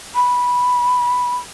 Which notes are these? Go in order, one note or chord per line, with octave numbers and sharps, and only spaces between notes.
B5